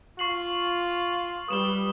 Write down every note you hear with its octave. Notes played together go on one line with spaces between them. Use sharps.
F4 C#6 C7 F#7
G3 B4 D#6 E7 G7